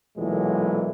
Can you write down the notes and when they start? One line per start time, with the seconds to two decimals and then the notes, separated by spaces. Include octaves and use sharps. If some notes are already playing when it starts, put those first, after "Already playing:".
0.18 B1 A#2 E3 F#3 G#3 A3